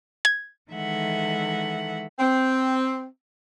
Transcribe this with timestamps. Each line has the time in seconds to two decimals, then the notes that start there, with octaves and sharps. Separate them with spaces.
0.25 G#6
0.71 D#3 E3 G#3 A4 E5 F#5
2.19 C4